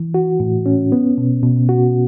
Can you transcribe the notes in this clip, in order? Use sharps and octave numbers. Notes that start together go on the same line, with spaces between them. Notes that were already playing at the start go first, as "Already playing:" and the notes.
Already playing: E3
F#4
A2
C#4
B3
B2
B2
F#4